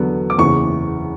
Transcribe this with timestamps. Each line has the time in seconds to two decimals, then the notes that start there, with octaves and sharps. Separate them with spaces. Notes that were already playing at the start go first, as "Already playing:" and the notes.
Already playing: E2 D3 F#3 B3
0.30 D6
0.38 F#1 E2 C#3 E3 C#6